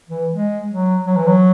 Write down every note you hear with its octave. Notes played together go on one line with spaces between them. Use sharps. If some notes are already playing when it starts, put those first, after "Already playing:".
E3
G#3
F#3
F#3
E3
F#3